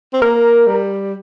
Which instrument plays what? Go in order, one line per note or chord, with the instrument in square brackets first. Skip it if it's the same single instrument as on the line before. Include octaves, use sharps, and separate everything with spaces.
[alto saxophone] C4
[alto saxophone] A#3 [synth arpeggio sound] A#4
[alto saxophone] G3